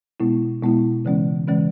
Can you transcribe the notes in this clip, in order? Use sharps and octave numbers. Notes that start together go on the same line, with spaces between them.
B2 G#3 B3 E4
B2 G#3 B3 E4
C#3 E3 G#3 C#4
C#3 E3 G#3 C#4